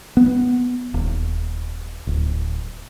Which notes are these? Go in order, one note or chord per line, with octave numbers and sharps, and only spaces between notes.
B3
D#1
D1